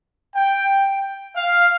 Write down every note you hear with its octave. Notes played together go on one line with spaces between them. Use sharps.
G5
F5